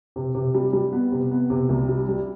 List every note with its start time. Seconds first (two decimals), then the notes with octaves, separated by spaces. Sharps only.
0.16 C3
0.35 C3
0.55 G3
0.73 G3
0.92 B3
1.12 C3
1.31 B3
1.50 C3
1.69 C2
1.89 G3
2.09 G3